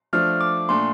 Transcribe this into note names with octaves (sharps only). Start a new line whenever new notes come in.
F3 A3 D4 F6
D6
A#2 A3 D4 C6